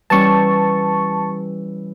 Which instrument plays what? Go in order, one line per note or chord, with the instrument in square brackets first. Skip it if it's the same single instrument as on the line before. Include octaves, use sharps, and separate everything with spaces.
[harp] E3 G3 C#4 [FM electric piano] A5 C#6